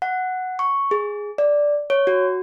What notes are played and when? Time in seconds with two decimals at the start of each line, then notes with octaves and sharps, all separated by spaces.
0.02 F#5
0.59 C#6
0.91 G#4
1.38 D5
1.90 C#5
2.07 F#4